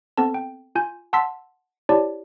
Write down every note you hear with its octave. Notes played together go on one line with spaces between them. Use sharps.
B3 C4 A4 A5
G5
F4 G#5 G6
F#5 A5 C6 E6 B6
E4 G4 C#5 D5 A5